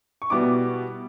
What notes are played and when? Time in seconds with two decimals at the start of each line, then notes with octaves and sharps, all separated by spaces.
0.22 C#6
0.30 B2 G3 B3 E4 D6